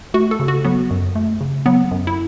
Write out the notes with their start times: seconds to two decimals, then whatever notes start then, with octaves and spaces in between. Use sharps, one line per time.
0.14 A3 F#4
0.31 A4
0.40 C#3
0.48 F#4
0.65 F#3 B3
0.91 F#2
1.16 A3
1.41 C#3
1.66 F#3 B3
1.91 F#2
2.07 E4